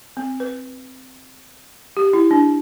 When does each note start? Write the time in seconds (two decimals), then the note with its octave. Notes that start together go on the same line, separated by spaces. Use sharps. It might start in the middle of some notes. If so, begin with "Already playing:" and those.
0.17 C4
0.40 B4
1.97 G4
2.13 E4
2.31 D4